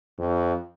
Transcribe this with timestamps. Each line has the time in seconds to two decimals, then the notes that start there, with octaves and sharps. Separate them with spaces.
0.18 F2